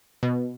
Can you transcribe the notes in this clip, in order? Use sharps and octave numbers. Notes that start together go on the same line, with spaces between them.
B2